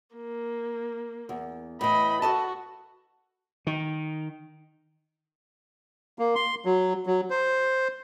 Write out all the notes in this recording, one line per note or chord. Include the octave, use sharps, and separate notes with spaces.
A#3
E2
A2 E3 D#5 B5
F#4 A4 D#5 A5
D#3
A#3
C6
F#3
F#3
C5